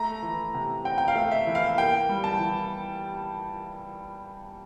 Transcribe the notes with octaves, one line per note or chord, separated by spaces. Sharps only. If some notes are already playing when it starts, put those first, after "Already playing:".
Already playing: A3 A#5
E3
C3
C4 G5
G5
F5
A3
E5
E3
F5
A#3 G5
G3
A5
E3